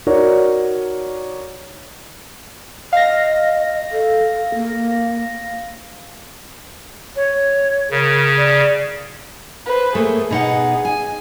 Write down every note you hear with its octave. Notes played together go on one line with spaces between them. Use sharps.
D#4 F#4 A#4 C#5 D5
D#5 F5 A#6
A4
A#3
C#5
C#3 A#4
D5
B4 C5
A3 A#3 G#4
B2 D#4 F#5
G#5